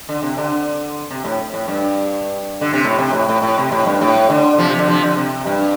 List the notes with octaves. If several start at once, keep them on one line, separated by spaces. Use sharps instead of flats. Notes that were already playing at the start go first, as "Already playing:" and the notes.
D3
C3
D3
C3
A2
A2
G2
D3
C3
A2
C3
A2
A2
A2
C3
A2
G2
A2
D3
C3 F3
C3
D3
C3 F3
D3
C3
G2